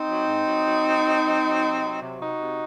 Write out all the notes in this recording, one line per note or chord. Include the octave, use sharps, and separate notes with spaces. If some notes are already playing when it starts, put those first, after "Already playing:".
Already playing: C4 D#4
F#3
G#2
F#3
F#3
F#3
F#3
F#3
F#3
C3
F#3
C3
C3 D#4 F#4
C3